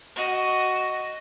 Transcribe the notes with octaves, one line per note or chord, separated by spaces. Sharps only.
F#4 D#5